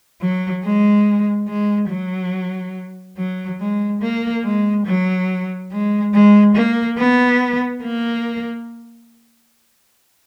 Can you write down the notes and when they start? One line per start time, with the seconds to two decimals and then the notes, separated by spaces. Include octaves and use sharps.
0.21 F#3
0.64 G#3
1.48 G#3
1.90 F#3
3.18 F#3
3.60 G#3
4.02 A#3
4.44 G#3
4.86 F#3
5.72 G#3
6.14 G#3
6.56 A#3
6.98 B3
7.83 A#3